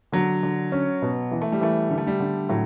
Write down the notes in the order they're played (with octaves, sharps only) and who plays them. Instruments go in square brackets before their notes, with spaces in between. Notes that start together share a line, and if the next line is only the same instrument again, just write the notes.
[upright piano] D3 [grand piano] F#3
[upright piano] D3
C#4
B2
E3
[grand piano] A3
G3
[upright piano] E3 [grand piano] A3
[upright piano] D3 [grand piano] G3
[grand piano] A3
G3
[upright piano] D3
[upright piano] A2 [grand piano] F#3